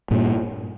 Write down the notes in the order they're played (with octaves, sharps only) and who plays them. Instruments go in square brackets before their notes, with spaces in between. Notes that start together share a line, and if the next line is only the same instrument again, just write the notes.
[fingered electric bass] G2 A#2